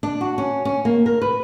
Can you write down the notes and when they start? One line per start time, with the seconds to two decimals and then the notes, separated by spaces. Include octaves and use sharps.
0.03 D4
0.21 F#4
0.38 C#4
0.65 C#4
0.85 A#3
1.06 A#4
1.22 B4